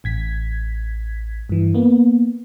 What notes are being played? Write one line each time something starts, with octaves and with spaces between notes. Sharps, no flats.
A1 G#6 B6
G2 E3
A#3 B3